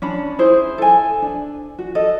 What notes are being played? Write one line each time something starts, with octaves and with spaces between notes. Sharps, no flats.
C#4 D4 B5
E4 G#4 C5
A4 G#5
D4
F#4
A4 D#5